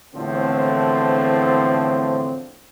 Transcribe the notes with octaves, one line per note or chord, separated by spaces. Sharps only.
E2 A2 D3 F3 C4